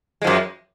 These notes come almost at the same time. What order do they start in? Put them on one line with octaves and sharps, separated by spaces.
G#3 F3 F#2